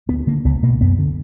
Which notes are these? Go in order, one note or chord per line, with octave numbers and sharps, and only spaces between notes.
D2 B3
D3 A#3
C#2 B3
B2 A#3
F#2 B3
D3